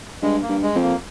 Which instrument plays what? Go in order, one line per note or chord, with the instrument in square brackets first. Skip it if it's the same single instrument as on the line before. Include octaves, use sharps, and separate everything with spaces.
[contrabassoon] G2 [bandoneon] G#3
[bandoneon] A#3
[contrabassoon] G2
[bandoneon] G#3
[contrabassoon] F2
[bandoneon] A#3